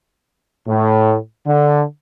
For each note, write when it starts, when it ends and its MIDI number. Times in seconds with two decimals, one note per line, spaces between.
0.68 1.16 45
1.47 1.84 50